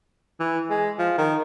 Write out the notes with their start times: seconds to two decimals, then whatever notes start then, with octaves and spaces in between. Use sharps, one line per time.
0.40 E3
0.70 G#3
0.99 F3
1.18 D#3